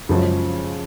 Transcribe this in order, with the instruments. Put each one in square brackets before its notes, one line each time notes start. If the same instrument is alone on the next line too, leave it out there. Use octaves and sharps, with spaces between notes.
[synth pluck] F#2 [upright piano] C#3 F3 G#3 C#4 F4